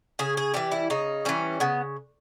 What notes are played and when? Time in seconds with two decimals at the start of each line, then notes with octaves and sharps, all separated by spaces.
0.19 C#3 G#4
0.37 G#4
0.54 E3 G3 G4
0.71 E4
0.90 C#3 D#4
1.25 E3 G3 C#4
1.60 C#3 B3